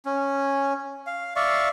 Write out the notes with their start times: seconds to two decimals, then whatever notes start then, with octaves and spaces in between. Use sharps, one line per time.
0.06 C#4
1.07 F5
1.36 D5 E5 F5 C#6